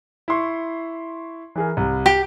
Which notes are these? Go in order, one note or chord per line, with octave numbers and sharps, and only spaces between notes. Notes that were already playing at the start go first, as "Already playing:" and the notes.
E4 C6 C#6
E3 G#4 A#4
C2
G4